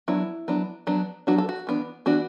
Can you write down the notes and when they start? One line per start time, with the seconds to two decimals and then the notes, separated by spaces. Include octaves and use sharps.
0.08 F#3 B3 D4 E4
0.48 F#3 B3 D4
0.87 F#3 B3 D4
1.27 F#3 B3 D4 F#4
1.38 A4
1.49 F#4
1.67 E3 B3 D4
2.06 E3 B3 D4 F#4